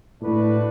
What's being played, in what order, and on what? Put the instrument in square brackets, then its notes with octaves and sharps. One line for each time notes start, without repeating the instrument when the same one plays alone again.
[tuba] A2 [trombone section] A3 D4 F#4 B4